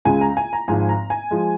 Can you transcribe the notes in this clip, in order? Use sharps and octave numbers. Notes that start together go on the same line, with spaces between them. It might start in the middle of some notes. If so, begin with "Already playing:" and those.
C#2 C#3 G#3 G#5
A#5
G#5
A#5
G#1 G#2 F3 G#5
A#5
G#5
F3 G#3